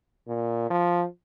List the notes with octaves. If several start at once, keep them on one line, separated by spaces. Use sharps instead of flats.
A#2
F3